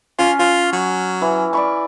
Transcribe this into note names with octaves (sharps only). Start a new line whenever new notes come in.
C#4 F4
F4
F#3
E3
D5 B5 C#6